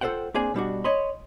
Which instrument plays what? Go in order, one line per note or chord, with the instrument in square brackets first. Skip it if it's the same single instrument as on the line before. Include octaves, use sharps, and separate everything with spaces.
[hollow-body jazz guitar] F4 A4 B4 C5 F#5 G5
A#3 C4 D4 G#4 G#5
B2 G3 D4 F#4
C#5 D#5 B5 C6